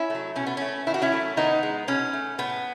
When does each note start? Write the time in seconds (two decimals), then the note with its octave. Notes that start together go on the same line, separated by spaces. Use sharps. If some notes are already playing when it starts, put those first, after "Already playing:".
Already playing: C#4 E4
0.10 F#3 A3
0.36 B2 C#4
0.47 B3
0.57 A3 C#4
0.87 D#3 E4
0.94 F#4
1.02 C#4 E4
1.12 F#3 A3
1.37 D#3 B3 D#4
1.63 G#3
1.88 B2 C#4
2.13 A3
2.38 A2 B3